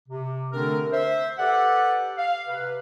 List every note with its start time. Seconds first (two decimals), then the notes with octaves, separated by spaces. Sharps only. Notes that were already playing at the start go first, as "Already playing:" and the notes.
0.08 C3
0.52 D3 A3 C4 D4 A#4
0.93 C5 E5
1.39 G4 A4 B4 D5 F#5
2.18 F5
2.48 C3 B4